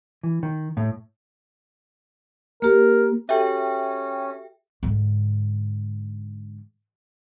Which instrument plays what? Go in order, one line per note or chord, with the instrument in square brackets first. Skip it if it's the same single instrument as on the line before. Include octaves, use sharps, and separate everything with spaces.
[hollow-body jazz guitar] E3
D#3
A2
[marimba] A#3 G4 [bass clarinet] A#4
[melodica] C#4 [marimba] F#4 G4 A4 [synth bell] E5 G5
[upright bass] G#2 D3